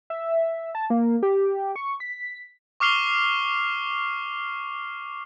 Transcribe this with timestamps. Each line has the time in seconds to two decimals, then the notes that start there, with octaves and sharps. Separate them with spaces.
0.10 E5
0.75 A5
0.90 A#3
1.23 G4
1.76 C#6
2.00 B6
2.80 C#6 D6 F6 C7 F7 G7